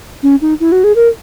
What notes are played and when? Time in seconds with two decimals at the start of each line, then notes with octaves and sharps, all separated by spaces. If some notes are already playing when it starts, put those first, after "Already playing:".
0.23 C#4
0.41 D#4
0.60 E4
0.72 F#4
0.84 G#4
0.96 A#4